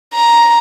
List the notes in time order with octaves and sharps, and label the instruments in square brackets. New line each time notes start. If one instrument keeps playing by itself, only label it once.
[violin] A#5